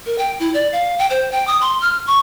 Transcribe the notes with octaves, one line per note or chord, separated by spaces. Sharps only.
A#4
G5
E4
D5
F5
G5
C5
G5
D#6
C6
F6
C#6